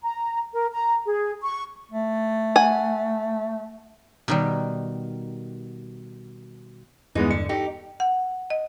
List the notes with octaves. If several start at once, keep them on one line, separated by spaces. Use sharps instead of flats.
A#5
A#4
A#5
G#4
C#6
A3
F#5 G#5
B2 D#3 G3
E2 G2 E3 G#3 B3 D#4
D3 C#7
D#4 G4 A4
F#5
D#5